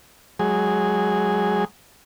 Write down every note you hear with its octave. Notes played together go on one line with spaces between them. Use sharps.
F#3 G#3 G#4